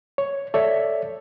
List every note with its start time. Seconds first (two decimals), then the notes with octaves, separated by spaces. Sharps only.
0.18 C#5
0.54 A4 C#5 D5 E5